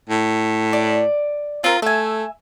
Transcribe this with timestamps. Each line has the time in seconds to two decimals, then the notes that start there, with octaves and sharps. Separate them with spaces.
0.10 A2
0.73 D5
1.64 C4 F4 A#4
1.82 A3 E5 G#5